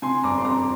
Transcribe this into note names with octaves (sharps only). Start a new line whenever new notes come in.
C3 G#5 C6
G1 A#5 D6
C6
F2 A#5 D6